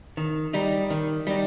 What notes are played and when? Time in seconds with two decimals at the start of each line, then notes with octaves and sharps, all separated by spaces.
0.17 D#3
0.53 G3 D#4
0.90 D#3
1.27 G3 D#4